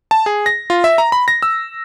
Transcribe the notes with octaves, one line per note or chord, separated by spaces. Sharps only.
A5
G#4
A#6
F4
E5
A#5
B5
A#6
E6